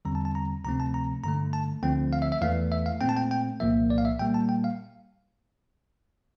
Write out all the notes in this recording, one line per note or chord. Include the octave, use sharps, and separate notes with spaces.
E2 D3 G3 C4 A#5
A5
A5
A#5
D2 C3 F3 A3 C4 A#5
A5
A#5
G2 D3 A3 A#5
A5
D2 D3 F3 A3 C4 G5
F5
E5
E5
E2 E3 A3 F5
E5
F5
A#2 A3 C4 G5
A5
G5
G5
C2 A#2 F3 A#3 E5
D5
F5
E5
A#2 G3 A#3 G5
A5
G5
F5